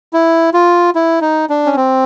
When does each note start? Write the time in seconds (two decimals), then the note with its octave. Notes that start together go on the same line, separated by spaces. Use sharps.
0.13 E4
0.54 F4
0.95 E4
1.21 D#4
1.49 D4
1.66 C#4
1.76 C4